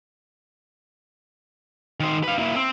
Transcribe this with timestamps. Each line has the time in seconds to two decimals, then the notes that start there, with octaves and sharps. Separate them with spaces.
2.00 D#3 C5
2.23 B4 F5
2.38 A#3 E4
2.56 C4